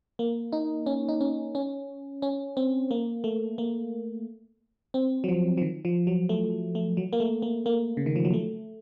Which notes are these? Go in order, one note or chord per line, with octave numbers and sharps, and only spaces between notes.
A#3
D#4
C#4
D#4
C#4
C#4
C#4
C4
A#3
A3
A#3
C4
F#3
F3
F3
D#3
F3
F#3
A3
A3
F#3
A#3
A3
A#3
A#3
C#3
D#3
F3
F#3
A3